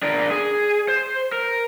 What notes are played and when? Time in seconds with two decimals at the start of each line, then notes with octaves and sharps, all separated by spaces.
0.03 D4 A#4 D5
0.31 G#4
0.88 C5
1.32 A#4